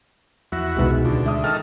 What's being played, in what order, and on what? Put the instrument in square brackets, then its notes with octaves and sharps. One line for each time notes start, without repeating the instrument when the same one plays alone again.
[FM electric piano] E2 F3 A#6 [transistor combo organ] E4 F#4
[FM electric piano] C2 B5 [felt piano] B2 D#3 G#3
[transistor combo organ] D2 [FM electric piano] C#3 F4
[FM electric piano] G#3 [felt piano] E5 D#6
[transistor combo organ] D#3 A4 [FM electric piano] G5 D6 E6 [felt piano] F6